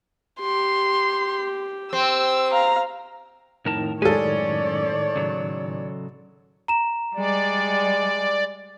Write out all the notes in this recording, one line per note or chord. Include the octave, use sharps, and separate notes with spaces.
G4 C6
C4 E6
F5 A#5
F2 A2 D#3 A#4 A5
F#2 G#3 C#4 A4 C#5 D5 G#5
C#3 F#3
A#5 E7
G3 G#3 D5